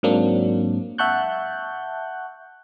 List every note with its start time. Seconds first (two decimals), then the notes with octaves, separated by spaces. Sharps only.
0.03 G#2 F#3 A#3 C4 D4
0.98 E5 F#5 A5 C#6 F#6 G6